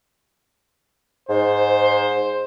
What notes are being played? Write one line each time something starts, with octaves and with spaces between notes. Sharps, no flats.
G#2 C5